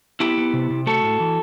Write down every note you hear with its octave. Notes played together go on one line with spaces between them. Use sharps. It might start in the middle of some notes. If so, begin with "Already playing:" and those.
B3 E4 G4
B3
C3
C3
A3 F#4 A4
A2
E3